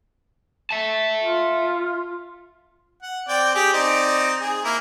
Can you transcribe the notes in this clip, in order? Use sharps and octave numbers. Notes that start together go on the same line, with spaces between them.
E5 A5
F4
F#5
C4 D5 G5
G4 G#4
C4 D#4 D5
G#4
A#3 E4 A#4